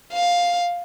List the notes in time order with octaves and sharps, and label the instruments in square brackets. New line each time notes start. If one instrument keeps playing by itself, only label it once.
[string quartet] F5